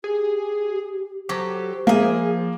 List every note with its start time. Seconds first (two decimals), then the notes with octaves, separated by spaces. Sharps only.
0.04 G4 G#4
1.29 F#3 G4 A4 C5
1.87 F3 A#3 G#4 E5